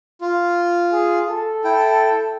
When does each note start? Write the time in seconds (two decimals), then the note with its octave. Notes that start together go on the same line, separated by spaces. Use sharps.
0.21 F4
0.93 G#4
1.29 A4
1.64 E4 G5